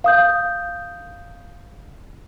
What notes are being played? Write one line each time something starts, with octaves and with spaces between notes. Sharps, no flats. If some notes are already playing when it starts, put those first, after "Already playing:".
F5 D#6 G6